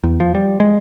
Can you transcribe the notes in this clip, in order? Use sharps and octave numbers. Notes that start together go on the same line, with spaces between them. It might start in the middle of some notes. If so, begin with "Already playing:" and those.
E2
F3
G3
G#3